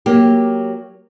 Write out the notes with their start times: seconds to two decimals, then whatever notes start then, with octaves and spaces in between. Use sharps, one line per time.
0.06 F#3 A#3 G4